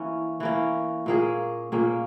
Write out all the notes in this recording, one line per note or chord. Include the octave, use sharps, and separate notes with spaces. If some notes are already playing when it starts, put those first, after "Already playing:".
Already playing: E3 A#3 C#4
E3 A#3 C#4
A#2 A#3 C#4 G#4
A#2 A#3 C#4 G#4